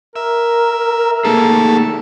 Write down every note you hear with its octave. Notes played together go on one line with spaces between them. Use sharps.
A#4 E5
A3 A#3 D#4 G#4 A4